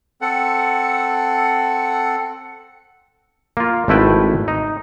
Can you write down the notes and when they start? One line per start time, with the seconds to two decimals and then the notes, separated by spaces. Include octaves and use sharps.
0.21 C4 A4 F#5
3.57 A#3 F4
3.88 G#1 A3 E4 B4 G5
4.48 D#4